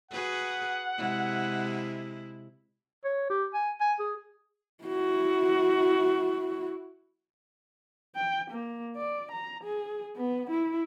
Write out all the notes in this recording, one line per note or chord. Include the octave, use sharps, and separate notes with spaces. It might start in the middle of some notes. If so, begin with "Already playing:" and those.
F#4 G#4 B4 F#5
C3 G#3 E4
C#5
G4
G#5
G#5
G#4
E4 F#4
G5
A#3
D5
A#5
G#4
B3
E4